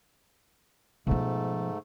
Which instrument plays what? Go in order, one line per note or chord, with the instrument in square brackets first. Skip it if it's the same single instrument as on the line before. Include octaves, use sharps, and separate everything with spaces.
[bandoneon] G#2 A3 [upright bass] B2 F3